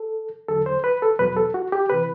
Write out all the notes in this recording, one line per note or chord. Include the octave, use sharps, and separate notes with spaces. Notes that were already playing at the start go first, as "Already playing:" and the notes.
Already playing: A4
E2 D3 F#3 A4
C5
B4
A4
E2 B2 F#3 B4
A4
F#4
G4
C3 E3 B4